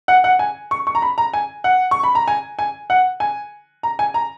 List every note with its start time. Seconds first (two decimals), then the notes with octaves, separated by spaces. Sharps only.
0.08 F#5
0.24 F#5
0.39 G#5
0.71 C#6
0.87 C#6
0.95 A#5
1.02 B5
1.18 A#5
1.34 G#5
1.64 F#5
1.91 C#6
2.03 B5
2.15 A#5
2.28 G#5
2.59 G#5
2.90 F#5
3.20 G#5
3.83 A#5
3.99 G#5
4.14 A#5